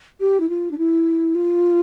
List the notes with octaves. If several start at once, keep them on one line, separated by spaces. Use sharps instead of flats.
G4
E4
F4
D4
E4
F4